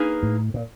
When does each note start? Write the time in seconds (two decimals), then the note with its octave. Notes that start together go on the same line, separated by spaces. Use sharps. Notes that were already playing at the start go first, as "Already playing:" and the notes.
Already playing: A#3 D#4 G#4 B4
0.23 A2
0.54 A#2